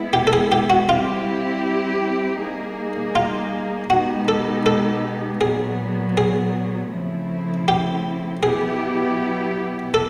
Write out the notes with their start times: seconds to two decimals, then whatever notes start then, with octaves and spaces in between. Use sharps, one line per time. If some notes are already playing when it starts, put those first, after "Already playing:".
Already playing: G#3 B3 E4
0.13 G4
0.27 A4
0.33 G#4
0.52 G4
0.70 F#4
0.89 G3 C4 E4 F4 G4
2.40 G3 A#3 D#4 G#4
3.15 F4
3.90 B2 G#3 B3 D#4 F#4 G4
4.28 A4
4.66 A4
5.41 A#2 F#3 B3 G#4
6.17 G#4
6.92 C#3 F3 A3 C4 E4
7.68 G4
8.43 B2 F#3 B3 E4 G4 G#4
9.94 A4